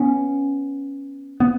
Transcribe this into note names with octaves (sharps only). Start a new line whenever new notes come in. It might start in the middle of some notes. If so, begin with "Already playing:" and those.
Already playing: B3 C#4
B3